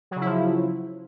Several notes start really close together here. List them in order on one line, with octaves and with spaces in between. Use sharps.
F#3 C#3 E4 F3